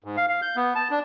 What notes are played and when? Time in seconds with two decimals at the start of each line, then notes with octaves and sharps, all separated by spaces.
0.04 G#2
0.17 F5
0.29 F5
0.42 G6
0.56 B3
0.76 A5
0.91 D4